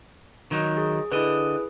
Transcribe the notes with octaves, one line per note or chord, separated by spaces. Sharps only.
D#3 F#3 D#4
G#4
D3 E4 G#4 B4 D#5